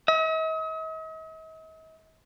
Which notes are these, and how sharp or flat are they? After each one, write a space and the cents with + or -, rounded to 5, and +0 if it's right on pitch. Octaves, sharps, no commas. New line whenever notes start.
D#5 +45